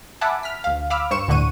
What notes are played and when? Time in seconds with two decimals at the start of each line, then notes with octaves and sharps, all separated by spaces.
0.21 E5 F#5 G#5 A5 B5 D6
0.43 F6 B6
0.64 D2 F5
0.90 F5 B5 D6 E6 F6
1.11 G2 C5 C#6 C#7 E7
1.28 D2 A2 D3 F#5 C#6 D#7